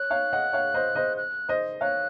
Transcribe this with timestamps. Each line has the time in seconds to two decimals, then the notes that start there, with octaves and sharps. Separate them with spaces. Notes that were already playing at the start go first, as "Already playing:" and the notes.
Already playing: C#5 F#6
0.10 C#5 F5
0.33 D#5 F#5
0.53 C#5 F5
0.74 C5 D#5
0.95 C5 D#5
1.17 F#6
1.49 C5 D#5
1.81 C#5 F5 F#6